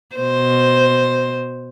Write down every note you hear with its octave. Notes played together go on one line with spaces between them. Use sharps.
B2 C5